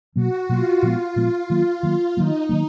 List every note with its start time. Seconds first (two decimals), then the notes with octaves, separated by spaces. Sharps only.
0.16 B2 F#3 A#3 F#4
0.49 B2 F#3 A#3 F4
0.82 A#2 F3 G#3 B3 F4
1.16 A#2 F3 G#3 B3
1.50 D#3 F#3 A#3
1.83 D#3 F#3 A#3
2.16 D#3 F#3 A#3 D#4
2.49 D#3 F#3 A#3